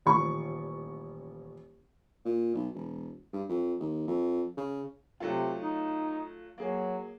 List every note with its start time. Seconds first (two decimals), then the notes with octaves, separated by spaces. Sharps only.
0.06 D#1 A1 F3 C#6
2.25 A#2
2.55 B1
2.74 E1
3.33 G2
3.49 F2
3.80 D#2
4.08 F2
4.57 C#3
5.20 C3 F#3 A3 F4
5.61 D#4
6.58 F#3 A#3 G#4